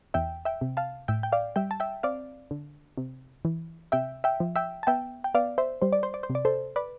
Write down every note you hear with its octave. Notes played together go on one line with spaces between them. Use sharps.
E2 E5 G5
E5 G5
C3
F5 A5
A2 E5 G5
G5
D5 F5
G3 E5 G5
A5
E5 G5
C4 D5 F5
D3
C3
E3
C3 E5 G5
E5 G5
F3
E5 G5
A5
B3 E5 G5
G5
B3 D5 F5
C5 E5
G3 C5
D5
C5
D5
C5
C3
D5
A4 C5
B4 D5